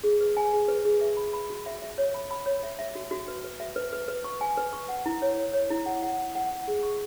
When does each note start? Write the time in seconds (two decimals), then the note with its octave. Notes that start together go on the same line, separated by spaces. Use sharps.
0.04 G#4
0.21 B4
0.37 G#5
0.53 G#4
0.68 B4
0.85 G#4
1.01 E5
1.17 B5
1.33 B5
1.50 F#4
1.66 E5
1.82 E5
1.98 C#5
2.14 B5
2.31 B5
2.46 C#5
2.63 E5
2.79 E5
2.95 F#4
3.11 F#4
3.28 B4
3.44 B4
3.60 E5
3.76 B4
3.93 B4
4.08 B4
4.24 C#6
4.41 G#5
4.57 B4
4.73 C#6
4.89 F#5
5.06 E4
5.22 C#5
5.38 C#5
5.53 C#5
5.70 E4
5.86 F#5
6.03 F#5
6.19 F#5
6.35 F#5
6.51 F#5
6.68 G#4
6.83 C#6